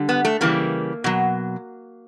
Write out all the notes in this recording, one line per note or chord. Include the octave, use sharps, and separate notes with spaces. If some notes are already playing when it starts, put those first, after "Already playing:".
Already playing: D3 G3
B3
A3
C#3 E3 G3 A#3
B2 F#3